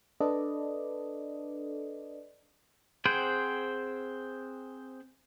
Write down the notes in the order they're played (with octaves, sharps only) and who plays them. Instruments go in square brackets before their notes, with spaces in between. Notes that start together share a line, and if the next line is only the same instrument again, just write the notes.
[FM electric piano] D4 A4 B4 D5 D#5
[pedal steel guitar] C4 G#4 C5 F#5 G5